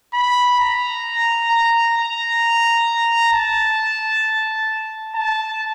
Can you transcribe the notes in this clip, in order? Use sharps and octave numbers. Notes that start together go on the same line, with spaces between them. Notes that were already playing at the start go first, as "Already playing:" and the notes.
B5
A#5
A#5
A#5
A5
A5